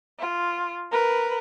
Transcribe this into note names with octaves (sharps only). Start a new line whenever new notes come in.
F4
A#4 B4